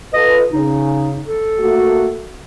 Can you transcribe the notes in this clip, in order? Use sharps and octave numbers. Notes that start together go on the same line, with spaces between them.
F4 A4 B4 D#5
C#3 D#4
A4
A3 A#3 F#4